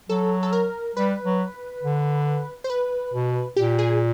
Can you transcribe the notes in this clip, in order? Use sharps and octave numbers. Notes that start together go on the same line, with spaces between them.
F#3 A4
A4
A#4
G3 B4
F#3
D3
C5
B4
B2
A#2 G4
G#4